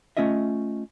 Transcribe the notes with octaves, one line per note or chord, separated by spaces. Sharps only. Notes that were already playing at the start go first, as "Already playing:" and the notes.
A3 C#4 F4 D#5 E5